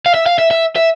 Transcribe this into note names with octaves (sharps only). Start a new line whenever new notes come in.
F5
E5
F5
E5
E5
E5